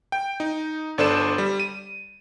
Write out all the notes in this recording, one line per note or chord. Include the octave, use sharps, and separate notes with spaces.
G5
D#4
G1 D4 A4 C5 D5 E7
G3
D#7